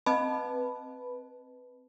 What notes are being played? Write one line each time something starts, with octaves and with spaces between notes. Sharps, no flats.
C4 B4 D#5 A5